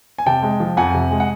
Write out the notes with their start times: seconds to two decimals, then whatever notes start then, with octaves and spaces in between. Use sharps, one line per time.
0.18 G#5
0.26 C3 G5 A5
0.43 G#3
0.60 F3
0.77 F2 F#5 G#5
0.94 C3
1.11 G#3
1.20 F#5